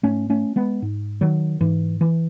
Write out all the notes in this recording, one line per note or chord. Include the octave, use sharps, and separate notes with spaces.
G#2 A3 C#4
A3 C#4
G#3 B3
G#2
D#3 F#3
G#2 E3
E3